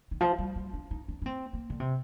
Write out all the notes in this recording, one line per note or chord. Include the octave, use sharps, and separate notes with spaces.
D#3
F3
G3
G3
D4
D#4
D4
D4
C4
A#3
D3
C3